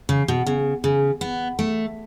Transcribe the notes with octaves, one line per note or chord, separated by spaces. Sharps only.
C#3
B2
C#3
C#3
B3
A3